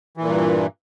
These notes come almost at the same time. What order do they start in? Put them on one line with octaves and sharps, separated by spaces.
E3 A#2 G2